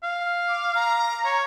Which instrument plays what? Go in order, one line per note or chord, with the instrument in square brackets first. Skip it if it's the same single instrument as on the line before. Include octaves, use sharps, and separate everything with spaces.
[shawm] F5
[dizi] D6
A#5
[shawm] C#5